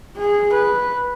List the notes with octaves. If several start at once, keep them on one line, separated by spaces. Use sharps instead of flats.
G#4
B4